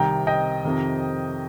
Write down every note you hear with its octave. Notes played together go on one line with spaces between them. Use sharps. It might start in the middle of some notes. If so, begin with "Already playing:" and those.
Already playing: C2 C3 D#3 G5 A#5
D#5 G5
F2 C3 D#3